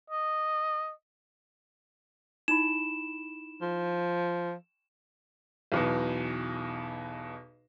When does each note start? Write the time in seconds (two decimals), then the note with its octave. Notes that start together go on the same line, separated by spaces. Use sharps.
0.10 D#5
2.48 D#4 E4 B5 E7
3.62 F3
5.72 B1 E2 B2